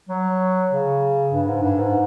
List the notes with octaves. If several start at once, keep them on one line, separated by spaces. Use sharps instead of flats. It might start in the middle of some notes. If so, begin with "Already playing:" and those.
F#3
C#3
G2
G#2
G2
G#2